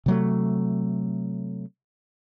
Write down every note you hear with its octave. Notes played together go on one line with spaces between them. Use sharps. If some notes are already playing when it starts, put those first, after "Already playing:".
C3 F#3 A3